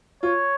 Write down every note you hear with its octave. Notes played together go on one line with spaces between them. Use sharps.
F4 C#5